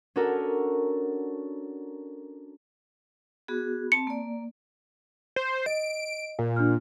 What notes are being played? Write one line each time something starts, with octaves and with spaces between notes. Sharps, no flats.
C#4 D4 F#4 A4 A#4
B3 F#4 G#4
C4 A5 C#7
A#3 D5
C5
D#5 D7
A#2
D4 F6